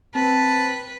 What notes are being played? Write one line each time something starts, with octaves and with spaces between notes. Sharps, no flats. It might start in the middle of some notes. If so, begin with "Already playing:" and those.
C4 B4 A5